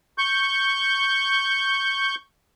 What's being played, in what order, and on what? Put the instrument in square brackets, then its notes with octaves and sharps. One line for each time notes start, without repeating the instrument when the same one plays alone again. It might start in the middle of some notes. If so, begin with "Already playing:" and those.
[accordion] C#6 G6